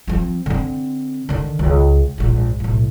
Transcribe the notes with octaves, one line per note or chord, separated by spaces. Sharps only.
F3 C4
D3 C4
D3 D#3
C#2
A#1 G#2
B1 A2